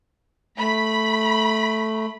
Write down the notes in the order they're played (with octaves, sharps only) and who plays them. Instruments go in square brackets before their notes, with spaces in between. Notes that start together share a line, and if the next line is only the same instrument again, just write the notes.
[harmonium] A3 [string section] B5